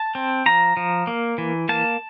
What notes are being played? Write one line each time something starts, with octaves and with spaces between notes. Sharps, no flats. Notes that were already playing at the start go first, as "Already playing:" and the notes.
Already playing: A5
C4
F3 A#5
F3
A#3
E3
A#3 A5